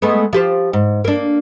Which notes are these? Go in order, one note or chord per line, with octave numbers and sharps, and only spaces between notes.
G#3 A3 B3
F3 G4 C5
G#2
A#3 D4